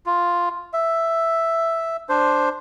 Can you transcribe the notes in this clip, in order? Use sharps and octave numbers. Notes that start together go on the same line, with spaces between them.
F4
E5
D4 C5